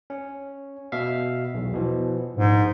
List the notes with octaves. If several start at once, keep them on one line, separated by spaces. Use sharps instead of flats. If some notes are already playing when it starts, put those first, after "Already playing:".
C#4
B2 E5 F5
B1 E2
B2 E3 F3
A#1 G#2